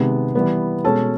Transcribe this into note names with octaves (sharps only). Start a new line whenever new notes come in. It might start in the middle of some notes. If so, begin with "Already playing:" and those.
Already playing: C3 D#3 G#3 B3
E3 G3 B3
B2 G#3 C#4 A4 A5